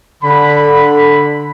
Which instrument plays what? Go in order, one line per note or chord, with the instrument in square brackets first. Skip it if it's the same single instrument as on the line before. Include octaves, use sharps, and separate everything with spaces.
[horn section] D3 B5